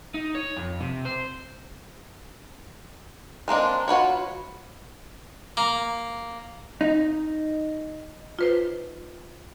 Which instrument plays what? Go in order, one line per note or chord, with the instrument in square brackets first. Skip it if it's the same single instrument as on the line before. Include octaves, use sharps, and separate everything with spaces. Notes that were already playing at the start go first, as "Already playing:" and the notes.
[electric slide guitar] D#4
C#5
F2
C3
C5
[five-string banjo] G#3 A#3 C4 D4
F4 F#4 B4 C#5
[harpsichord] A#3
[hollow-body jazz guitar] D#4
[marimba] F4 B4 C5